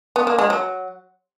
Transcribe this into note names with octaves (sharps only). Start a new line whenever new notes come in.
B3
A#3
G#3
F#3